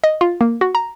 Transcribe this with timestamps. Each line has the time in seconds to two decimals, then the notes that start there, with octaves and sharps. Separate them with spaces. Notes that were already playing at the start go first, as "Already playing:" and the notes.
0.04 D#5
0.21 F4
0.41 A#3
0.61 F#4
0.75 A#5